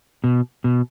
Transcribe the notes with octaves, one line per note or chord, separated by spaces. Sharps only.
B2
B2